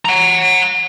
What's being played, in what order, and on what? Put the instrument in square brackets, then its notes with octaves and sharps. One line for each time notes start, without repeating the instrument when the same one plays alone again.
[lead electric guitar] F#5 A#5